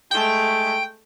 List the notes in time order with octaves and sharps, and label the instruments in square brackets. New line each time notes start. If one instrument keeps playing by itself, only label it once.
[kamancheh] G#3 A3 [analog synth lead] G5